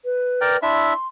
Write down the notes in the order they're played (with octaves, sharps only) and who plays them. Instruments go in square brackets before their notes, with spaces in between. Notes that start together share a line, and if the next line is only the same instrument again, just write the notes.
[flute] B4
[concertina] A#4 D5 G5
[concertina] D4 E4 E5 [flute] C6